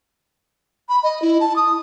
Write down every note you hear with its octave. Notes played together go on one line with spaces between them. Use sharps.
B5
D#5
E4
A5
D#6